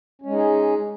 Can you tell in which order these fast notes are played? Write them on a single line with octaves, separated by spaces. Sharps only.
C#4 G#3 D#4 G#4